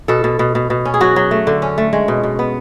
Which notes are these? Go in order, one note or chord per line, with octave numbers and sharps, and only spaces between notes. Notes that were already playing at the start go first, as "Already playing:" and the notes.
B2 A4
B2
B2
B2
B2
C#4
G#4
F#3 F#4
F#3
A3
D3
C#4
A3
G#3
B2
B2
B3